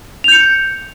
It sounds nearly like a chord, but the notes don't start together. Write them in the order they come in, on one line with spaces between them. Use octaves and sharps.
F7 G6 C#7